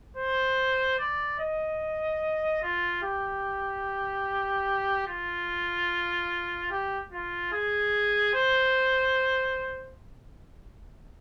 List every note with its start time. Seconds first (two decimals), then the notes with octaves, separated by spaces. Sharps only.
0.17 C5
0.99 D5
1.40 D#5
2.62 F4
3.03 G4
5.07 F4
6.71 G4
7.12 F4
7.52 G#4
8.34 C5